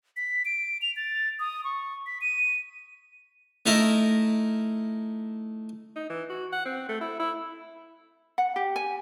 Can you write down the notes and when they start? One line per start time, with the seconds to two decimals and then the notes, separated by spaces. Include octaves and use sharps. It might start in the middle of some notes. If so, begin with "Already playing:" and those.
0.17 B6
0.45 D7
0.82 F7
0.96 A6
1.40 D#6
1.64 C#6
2.07 B6
2.21 D#7
3.66 A3 D#4 E4 A#4
5.96 D#4
6.10 E3
6.29 F#4
6.53 F#5
6.65 C4
6.89 A3
7.01 E4
7.20 E4
8.38 F#5
8.56 G4
8.76 G#5